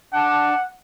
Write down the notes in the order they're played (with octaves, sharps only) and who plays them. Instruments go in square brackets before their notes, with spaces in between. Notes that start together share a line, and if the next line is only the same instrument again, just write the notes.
[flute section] D4 A5 D6 [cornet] F#5